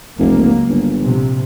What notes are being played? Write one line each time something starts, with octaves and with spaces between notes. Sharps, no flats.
F1 C#2 F#3 A#3
G1
A#1 C3